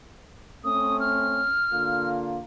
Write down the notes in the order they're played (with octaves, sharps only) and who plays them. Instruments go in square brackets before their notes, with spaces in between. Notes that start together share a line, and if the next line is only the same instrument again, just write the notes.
[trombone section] A3 C4 C#4 [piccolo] D#6
[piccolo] F6
[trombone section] D3 A#3 F4